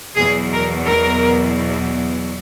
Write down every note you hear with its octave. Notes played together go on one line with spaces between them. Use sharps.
E2 B2 F#3 G#4
A#4
A#4